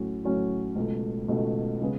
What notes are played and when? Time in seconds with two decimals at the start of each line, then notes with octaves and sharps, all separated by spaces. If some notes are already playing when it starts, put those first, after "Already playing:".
Already playing: A2 F#3 C#4 F#4
0.25 A2 F#3 C#4 F#4
0.76 C#2 B2 A3
1.28 C#2 B2 A3
1.81 C#3 G#3 B3